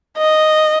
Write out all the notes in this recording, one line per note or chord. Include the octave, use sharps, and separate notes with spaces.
D#5